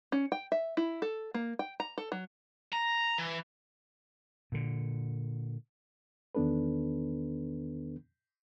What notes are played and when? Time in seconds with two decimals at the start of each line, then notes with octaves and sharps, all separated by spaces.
0.12 C#4
0.32 G5
0.52 E5
0.77 E4
1.02 A4
1.34 A#3
1.59 G5
1.80 A#5
1.98 A4
2.12 F#3
2.72 A#5
3.18 E3
4.52 A#2 D3
6.35 E2 D#3 B3 D4 A4 B4